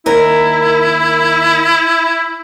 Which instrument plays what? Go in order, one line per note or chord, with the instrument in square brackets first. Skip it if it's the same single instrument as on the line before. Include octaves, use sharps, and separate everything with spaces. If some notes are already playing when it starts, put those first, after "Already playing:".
[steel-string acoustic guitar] D#2 A#4 [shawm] E4